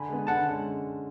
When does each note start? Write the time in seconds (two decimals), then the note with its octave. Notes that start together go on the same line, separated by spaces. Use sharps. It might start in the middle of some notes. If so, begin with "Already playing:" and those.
Already playing: D3 G#5 B5
0.09 G#3 B3
0.27 D3 F#5 A5
0.45 G#3 C#4